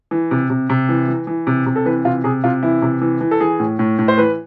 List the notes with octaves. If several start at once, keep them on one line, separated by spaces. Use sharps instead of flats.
E3
C3
C3
C3
E3
E3
E3
C3
C3
A4
E3 B4
C3 F4
C3 G#4
C3 F4
E3 E4
C3
E3
E3
A4
E3 G#4
A2
A2
A2
C5
E3 B4